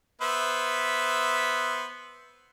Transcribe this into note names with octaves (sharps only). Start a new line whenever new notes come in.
B3 C5 E5